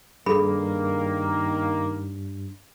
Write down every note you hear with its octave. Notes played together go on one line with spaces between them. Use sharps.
G2 D#3 A#3 G#4 A4 B5